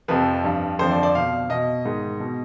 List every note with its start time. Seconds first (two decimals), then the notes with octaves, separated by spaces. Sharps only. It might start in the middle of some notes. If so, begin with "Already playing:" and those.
0.08 F2 C3 F3 B4
0.44 G2 F3
0.79 F2 D3 F3 C5
0.91 D5
1.03 D5
1.15 B2 F5
1.50 B2 D#5
1.85 G#2 D#3
2.20 B2